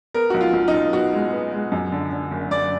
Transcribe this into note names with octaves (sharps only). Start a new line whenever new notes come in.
B3 A#4
B1 F#4
F4
B1
D#4
B1
B3 F#4
G#3
B3
G#3
F#2
D3
D3
F#1
F#1 D5